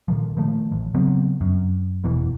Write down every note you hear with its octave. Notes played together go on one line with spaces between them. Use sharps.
A#2 D#3 F3
D#3 F3 A3
A1
C#3 F#3 B3 C4
F#2
F1 E2 B2 E3